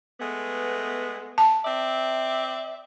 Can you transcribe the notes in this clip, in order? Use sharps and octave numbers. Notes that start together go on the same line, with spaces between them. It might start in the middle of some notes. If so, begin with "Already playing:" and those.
G#3 A3 B3
A5
C4 D5 E5